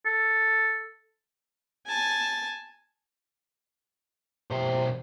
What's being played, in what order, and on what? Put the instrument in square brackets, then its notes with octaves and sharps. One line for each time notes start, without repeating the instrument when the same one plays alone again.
[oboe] A4
[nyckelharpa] G#5 A5
[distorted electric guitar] B1 C5 [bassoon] C3